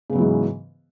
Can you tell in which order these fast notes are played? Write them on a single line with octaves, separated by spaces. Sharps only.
C#3 B3 F#3 E3 G#2